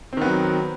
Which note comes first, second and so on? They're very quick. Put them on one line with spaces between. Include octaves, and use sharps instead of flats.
C4 D#3 B3 F#3